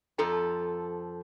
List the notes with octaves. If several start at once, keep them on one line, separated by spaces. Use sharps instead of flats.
F2 F3 A4 A#5